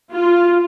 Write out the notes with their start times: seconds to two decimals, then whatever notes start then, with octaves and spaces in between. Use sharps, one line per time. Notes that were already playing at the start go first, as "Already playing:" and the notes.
0.12 F4